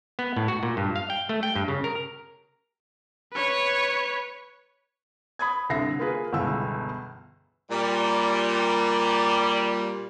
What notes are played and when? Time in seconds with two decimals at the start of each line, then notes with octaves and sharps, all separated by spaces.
0.19 B3
0.36 A2
0.48 F#4
0.63 A#2
0.77 G2
0.96 F5
1.10 G5
1.29 A3
1.43 G5
1.55 G2
1.68 C#3
1.84 A#4
3.33 B4 C#5
5.39 B5 D#6 G#6
5.69 C2 D3 E5 A#6 C7
5.99 A#3 F4 G#4 B4
6.32 G1 C#2 B2 E3 F5 E6
7.71 A#2 G3